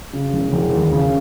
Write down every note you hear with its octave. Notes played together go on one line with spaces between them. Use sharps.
C#3
E1
E1
D#2
C#3